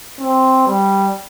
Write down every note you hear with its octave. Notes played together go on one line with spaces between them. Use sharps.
C4
G3